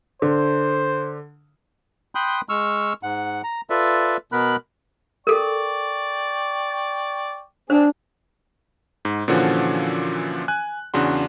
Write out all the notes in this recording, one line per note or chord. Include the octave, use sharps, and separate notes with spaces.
D3 C5
G5 B5 C6 D#6 F#6 G6
G#3 C#6 E6 F6
G#2 F#5
A#5
F4 A4 B4 D5 E5
B2 B3 A#4 B5 F#6
A4 A#4 D5 G5 C#6
C4 D4 G#4 C5
G#2
A#2 D3 E3 F3 C#4 F#4
G#5 F#6
E2 C#3 D4 F#4 C6